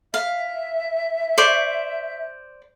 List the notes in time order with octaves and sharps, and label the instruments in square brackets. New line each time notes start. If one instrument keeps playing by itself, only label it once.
[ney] E5 [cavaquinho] F5
[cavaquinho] C5 D5 C#6